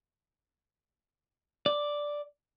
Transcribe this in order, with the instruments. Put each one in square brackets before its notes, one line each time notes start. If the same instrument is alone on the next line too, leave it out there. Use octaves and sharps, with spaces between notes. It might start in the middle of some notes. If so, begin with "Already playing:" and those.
[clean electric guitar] D5